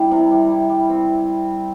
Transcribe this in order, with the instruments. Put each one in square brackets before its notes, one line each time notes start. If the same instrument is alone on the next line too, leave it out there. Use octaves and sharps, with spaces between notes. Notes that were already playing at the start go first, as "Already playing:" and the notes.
Already playing: [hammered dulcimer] G3 E4
C3
G3
E4
G3
C4